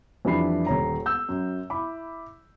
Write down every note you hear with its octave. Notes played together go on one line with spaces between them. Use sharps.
F2 E3 G3 D4 B5 C7
D#1 C#5 A#5
E6 G6
F#2
E4 B5 D6